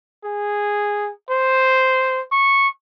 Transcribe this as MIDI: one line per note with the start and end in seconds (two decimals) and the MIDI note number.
0.25 1.10 68
1.31 2.22 72
2.32 2.68 85